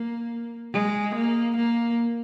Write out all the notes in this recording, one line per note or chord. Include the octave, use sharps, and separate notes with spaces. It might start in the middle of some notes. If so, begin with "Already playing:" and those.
Already playing: A#3
G#3
A#3
A#3